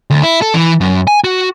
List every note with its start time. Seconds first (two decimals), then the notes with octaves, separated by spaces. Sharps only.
0.11 D2
0.23 E4
0.42 A4
0.54 E3
0.81 F#2
1.07 G#5
1.24 F#4